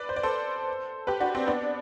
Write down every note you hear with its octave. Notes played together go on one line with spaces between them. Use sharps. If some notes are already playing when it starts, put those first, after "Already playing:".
Already playing: B4 D5
C5
D5
A4 C5
G4 B4
D4 F#4
C4
B3 D4